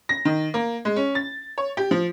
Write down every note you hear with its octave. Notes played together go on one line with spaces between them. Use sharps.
A#6
D#3
A#3
G#3
C#4
A6
C#5
G4
F3